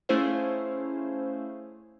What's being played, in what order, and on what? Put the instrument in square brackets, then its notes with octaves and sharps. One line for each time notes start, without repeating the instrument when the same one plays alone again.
[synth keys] A3 C#4 E4 G#4 C5 F5